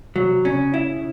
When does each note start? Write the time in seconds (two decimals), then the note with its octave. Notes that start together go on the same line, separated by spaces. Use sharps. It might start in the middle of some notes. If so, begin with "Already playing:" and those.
0.15 C3 F#3
0.45 C#3 C#4
0.74 E4